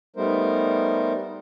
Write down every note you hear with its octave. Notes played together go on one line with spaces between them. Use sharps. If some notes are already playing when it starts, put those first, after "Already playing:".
G3 A3 B3 D#4 A#4 C5